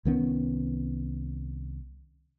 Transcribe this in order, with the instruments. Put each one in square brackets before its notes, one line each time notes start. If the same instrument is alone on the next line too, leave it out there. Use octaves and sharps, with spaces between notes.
[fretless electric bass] C2 D#3 B3 C#4